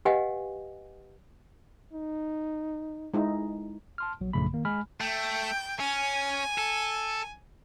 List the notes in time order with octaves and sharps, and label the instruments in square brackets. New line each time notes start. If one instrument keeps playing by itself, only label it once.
[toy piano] G4 B4 D#5 F5 F#5 G#5
[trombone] D#4
[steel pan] G#3 D#4 E4
[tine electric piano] A5 C6 F6
A#1 F#3
A#1 F#2 C#3 A3 B5
D#3 A#3
G#3 G#5 B5 F6
[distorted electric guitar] A3 [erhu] G5
[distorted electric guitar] C#4 [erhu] G#5
[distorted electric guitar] A4